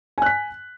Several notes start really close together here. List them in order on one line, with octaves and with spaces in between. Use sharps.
G#5 F#6 B6